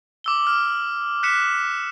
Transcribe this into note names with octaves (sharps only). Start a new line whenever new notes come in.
D6 E6 G7
F6
F#6 B6 C#7 E7